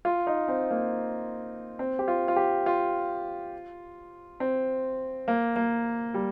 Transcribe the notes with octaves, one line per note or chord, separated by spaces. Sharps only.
F4
D#4
C4
A#3
C4
G4
F4
F4
G4
F4
C4
A#3
A#3
G3